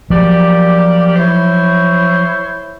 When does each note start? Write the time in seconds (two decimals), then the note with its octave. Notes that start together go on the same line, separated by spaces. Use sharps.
0.10 F3 F#3 A#3 G4 D5
1.16 E4 C5 C#5